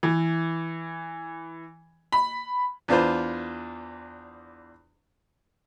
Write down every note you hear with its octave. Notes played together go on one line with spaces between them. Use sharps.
E3
B5
E2 D4 F4 B4 C5